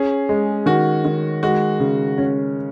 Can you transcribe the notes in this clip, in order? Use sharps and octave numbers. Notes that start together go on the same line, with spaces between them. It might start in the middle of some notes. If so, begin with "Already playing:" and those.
Already playing: C#4 G#4
G#3
D#3 F#4
D#3
G#3 F#4
C#3
C#4